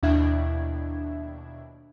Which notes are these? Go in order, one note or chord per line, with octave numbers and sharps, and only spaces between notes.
D#2 B2 D4 E4 E5 G#6